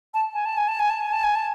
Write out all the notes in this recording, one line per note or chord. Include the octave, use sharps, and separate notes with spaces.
A5
G#5
A5
G#5
A5
G#5
A5
G#5
A5
G#5
A5